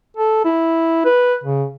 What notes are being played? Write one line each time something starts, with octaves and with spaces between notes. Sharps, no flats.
A4
E4
B4
C#3